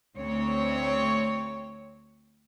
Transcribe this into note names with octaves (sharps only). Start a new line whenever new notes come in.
D2 C4 C#5